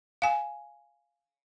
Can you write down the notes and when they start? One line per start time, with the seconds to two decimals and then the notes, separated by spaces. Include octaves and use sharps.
0.22 F5 G#5